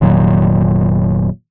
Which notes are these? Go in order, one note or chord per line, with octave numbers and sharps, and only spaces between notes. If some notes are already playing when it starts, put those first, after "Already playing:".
F1 A#2 D#3 F#3